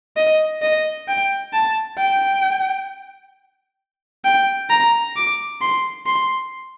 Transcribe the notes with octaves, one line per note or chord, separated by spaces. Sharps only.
D#5
D#5
G5
A5
G5
G5
A#5
D6
C6
C6